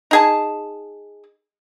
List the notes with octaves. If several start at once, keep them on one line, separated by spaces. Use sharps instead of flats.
D#4 G#4 A5